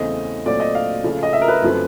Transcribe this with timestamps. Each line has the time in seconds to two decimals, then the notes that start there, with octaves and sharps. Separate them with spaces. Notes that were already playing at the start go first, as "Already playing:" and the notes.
Already playing: E2 C#3 E3 A3 C4 D#5
0.45 A#2 F#3 A3 C4 D5
0.60 D#5
0.75 F5
1.04 C#3 F3 A3
1.23 D#5
1.33 E5
1.42 A#4
1.48 B4
1.62 F#2 D3 F3 A3 C4